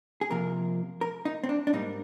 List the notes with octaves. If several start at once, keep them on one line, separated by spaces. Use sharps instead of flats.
G#4
F2 C3 F3 A#3 A#4
A#4
D#4
C4
D4
D4
G#2 G3 A#3 D#4